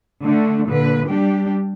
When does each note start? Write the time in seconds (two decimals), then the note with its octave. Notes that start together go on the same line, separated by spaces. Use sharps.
0.23 D3 A3 D4
0.69 A#2 D3 B4
1.08 G3 D4 G4